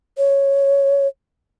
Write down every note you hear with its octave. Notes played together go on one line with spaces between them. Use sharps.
C#5